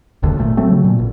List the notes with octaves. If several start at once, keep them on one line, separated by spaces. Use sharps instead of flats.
E1 A#1 D#2 D3
G#1 A#2 A3
F#3 A3 C4
C#3 F#3
A#2
A1